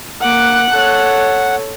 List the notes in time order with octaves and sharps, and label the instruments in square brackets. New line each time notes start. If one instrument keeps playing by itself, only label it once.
[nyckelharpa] A#3 D6 [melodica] F#5 [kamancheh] F#6
[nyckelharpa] A4 C#5